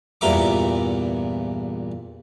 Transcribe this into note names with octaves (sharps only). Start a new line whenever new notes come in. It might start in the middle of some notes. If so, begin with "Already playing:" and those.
E2 G2 A#2 A#4 E5 D6